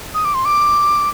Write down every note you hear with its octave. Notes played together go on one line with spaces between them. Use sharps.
D#6
D6
C6
D6